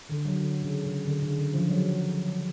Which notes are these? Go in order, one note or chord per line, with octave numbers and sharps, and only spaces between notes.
D3
F#3
D3
C#3
C#3
D3
C#3
D3
F3
F#3